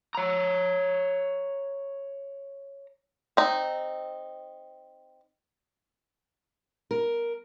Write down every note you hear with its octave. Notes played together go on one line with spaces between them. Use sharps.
C#5 A#5
C4 D#4
A#4